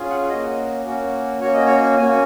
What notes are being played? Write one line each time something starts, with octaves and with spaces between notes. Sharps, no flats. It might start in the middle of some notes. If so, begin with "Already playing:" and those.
Already playing: C#4 F4 G#4
F#5
A#3 C#4 F#4 D#5
A#3 C#4 F#4
A#3 C#4 F#4 C#5
D#5
C#5
A#3 C#4 F#4 G#5